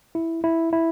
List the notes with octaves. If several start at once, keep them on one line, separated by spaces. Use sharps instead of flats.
E4
E4
E4